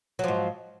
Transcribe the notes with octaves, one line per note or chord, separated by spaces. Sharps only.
G#2 F3 F#3